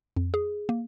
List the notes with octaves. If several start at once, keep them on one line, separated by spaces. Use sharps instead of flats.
F2
G#4
A#3